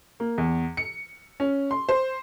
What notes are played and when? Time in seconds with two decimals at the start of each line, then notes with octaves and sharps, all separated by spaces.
0.20 A#3
0.38 E2
0.77 C#7
1.40 C#4
1.71 C6
1.89 C5